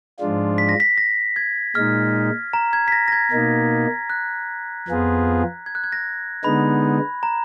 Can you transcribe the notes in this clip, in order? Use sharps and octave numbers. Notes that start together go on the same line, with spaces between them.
G#2 F3 G#3 D4 F4
B6
A#6
B6
A#6
G#6
A#2 G#3 D#4 F6
A#5
G#6
B6
A#6
A#6
G#6
B2 A#3 D#4
F#6
F2 F3 B3 F4 G#4
G#6
F#6
G#6
A#6
D3 G#3 B3 D#4 B5
A#5